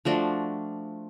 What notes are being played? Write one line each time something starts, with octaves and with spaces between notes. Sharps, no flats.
F3 A3 D4 F#4